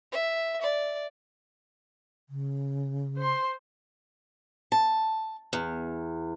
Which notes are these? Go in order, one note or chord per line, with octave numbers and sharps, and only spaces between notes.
E5
D5
C#3
C5 C6
A5
E2